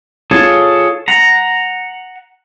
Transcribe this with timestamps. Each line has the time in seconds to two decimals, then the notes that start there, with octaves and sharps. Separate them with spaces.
0.31 F4 G#4 A4 C#5 A5
1.08 F#5 A#5